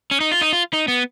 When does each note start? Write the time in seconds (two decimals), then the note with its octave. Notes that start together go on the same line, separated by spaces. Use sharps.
0.11 C#4
0.20 D#4
0.32 F4
0.41 D#4
0.53 F4
0.73 D#4
0.88 B3